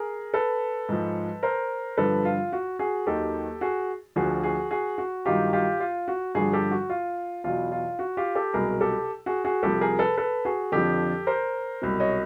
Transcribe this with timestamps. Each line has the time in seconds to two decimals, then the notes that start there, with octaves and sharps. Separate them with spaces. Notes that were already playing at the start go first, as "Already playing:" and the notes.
Already playing: G#4 A#4
0.34 A4 B4
0.89 G#2 F3
1.43 A#4 C5
1.97 G2 D3 F3 A4 B4
2.25 F4
2.52 F#4
2.79 F#4 G#4
3.06 D#2 D#3 F#3 G4 A4
3.61 F#4 G#4
4.16 D2 D3 F3 F#4 G#4
4.43 F#4 G#4
4.71 F#4 G#4
4.98 F#4
5.25 G2 D#3 F#3 F4 G4
5.53 F4 G4
5.80 F4
6.08 F#4
6.35 G2 D3 F3 F#4 G#4
6.53 G4 A4
6.71 F#4
6.90 F4
7.44 E2 B2 F#3 F4
7.72 F4
7.99 F#4
8.17 F4 G4
8.35 G4 A4
8.53 C2 B2 F#3 G#4 A#4
8.81 G4 A4
9.26 F#4 G#4
9.45 F#4 G#4
9.63 C2 C3 F3 G4 A4
9.81 G#4 A#4
9.99 A4 B4
10.17 A4 B4
10.45 F#4 G#4
10.72 F2 D3 F3 G4 A4
11.27 A#4 C5
11.82 C2 B2 F#3
12.00 C#5 D#5